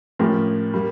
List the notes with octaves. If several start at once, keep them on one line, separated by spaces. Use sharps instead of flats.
A2 F3 C#4 G4 A#4
G3 A#3